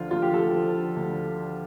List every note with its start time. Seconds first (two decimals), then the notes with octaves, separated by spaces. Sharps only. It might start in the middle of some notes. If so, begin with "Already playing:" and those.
Already playing: D2 D3 F3 F4
0.11 D2 F4
0.22 G4
0.34 D2 A4
0.55 F3
0.76 D3
0.96 D2